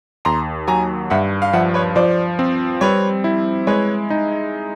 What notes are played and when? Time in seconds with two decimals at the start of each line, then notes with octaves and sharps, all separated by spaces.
0.25 D#2 A#5 C6
0.68 F#3 G#5 A#5
1.10 G2 E5 F#5
1.42 F5
1.53 F3 E5 F#5
1.74 B4 C#5
1.95 F3 C5 D5
2.39 C4
2.81 G3 B4 C#5
3.24 E4
3.67 G#3 B4 C#5
4.10 D#4